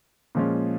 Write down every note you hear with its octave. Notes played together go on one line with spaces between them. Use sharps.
A#2 F3 G#3 C#4